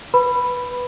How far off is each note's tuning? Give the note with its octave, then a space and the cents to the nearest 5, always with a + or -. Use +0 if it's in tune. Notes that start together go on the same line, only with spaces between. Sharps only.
B4 +0 B5 +0